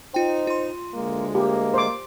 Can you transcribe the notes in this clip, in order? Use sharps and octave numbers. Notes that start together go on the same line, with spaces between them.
D#4 F4 C5 G5
F4 C6
D2 G#3 A#3
A#3 G4
C5 D6